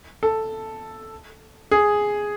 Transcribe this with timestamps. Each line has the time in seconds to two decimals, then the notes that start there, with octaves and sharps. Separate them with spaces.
0.23 A4
1.71 G#4